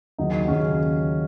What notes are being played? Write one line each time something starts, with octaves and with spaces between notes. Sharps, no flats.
D#2 C#3 F#3 D#4
D#2 C#3 F#3 C#4